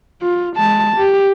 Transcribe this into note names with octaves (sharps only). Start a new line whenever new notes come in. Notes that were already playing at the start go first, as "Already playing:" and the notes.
F4
G#3 A5
G4